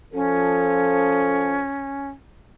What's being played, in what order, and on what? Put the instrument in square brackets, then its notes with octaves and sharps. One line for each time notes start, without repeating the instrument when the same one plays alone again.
[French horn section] F3 A4 [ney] C#4